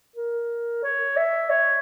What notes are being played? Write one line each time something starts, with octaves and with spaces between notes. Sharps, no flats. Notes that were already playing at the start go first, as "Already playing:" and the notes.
A#4
C#5
E5
C#5